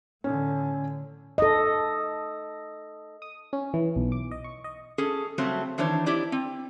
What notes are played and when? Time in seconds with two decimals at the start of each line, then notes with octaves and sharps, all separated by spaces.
0.24 A2 D3 C#4
1.38 A4 D#5
3.22 D#6
3.53 C#4
3.74 E3
3.96 B1
4.12 D6
4.31 D#5
4.44 C#6
4.64 D#5
4.98 C#4 G#4 A4
5.38 C#3 F#3 G3 A3 C4
5.78 D#3 E3 C4 D4 C5 C#5
6.06 E4 G4 D5 D#5
6.32 C4